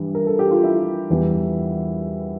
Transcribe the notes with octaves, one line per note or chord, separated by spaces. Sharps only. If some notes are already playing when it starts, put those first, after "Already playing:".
Already playing: G2 E3 G3
A#4
A4
G4
F4
E4
E2 E3 G3